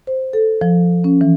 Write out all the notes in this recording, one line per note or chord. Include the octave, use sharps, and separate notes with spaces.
C5
A4
F3
C#4
E3